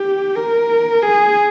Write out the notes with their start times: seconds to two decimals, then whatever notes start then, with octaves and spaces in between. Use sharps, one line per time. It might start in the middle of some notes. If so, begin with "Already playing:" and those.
Already playing: G4
0.34 A#4
1.02 G#4